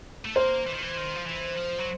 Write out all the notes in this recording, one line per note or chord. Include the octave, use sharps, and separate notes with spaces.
A3
A#3 C5
E3
D#3
E3
D#3
F3
E3
F3
F#3